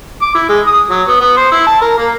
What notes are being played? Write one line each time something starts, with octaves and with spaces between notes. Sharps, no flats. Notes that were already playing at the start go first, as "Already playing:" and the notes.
D6
E4
G#3
D#6
F#3
B3
B3
C5
E4
A5
A#4
A#3